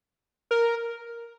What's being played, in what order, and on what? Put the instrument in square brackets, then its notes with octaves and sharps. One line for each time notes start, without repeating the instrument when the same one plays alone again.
[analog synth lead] A#4